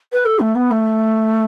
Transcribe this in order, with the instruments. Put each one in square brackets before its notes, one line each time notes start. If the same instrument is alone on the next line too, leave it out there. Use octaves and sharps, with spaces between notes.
[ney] B4
A4
A3
B3
A3